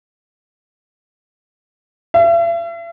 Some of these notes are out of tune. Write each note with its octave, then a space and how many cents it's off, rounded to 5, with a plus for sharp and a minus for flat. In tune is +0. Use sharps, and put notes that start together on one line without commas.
E5 +45